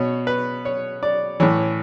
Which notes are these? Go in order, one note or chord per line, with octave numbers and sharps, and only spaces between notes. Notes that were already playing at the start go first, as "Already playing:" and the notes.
Already playing: B2 C#5
B4
C#5
D5
A2 E3 C#5